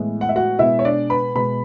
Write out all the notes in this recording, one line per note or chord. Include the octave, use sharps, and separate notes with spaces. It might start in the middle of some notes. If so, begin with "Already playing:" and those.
Already playing: A2 E3 G#3 B3
F#5
E5
F#4 F#5
B2 G#3 B3 E4 E5
C#5
D4 D5
B4 B5
B2 G#3 B3 B4 B5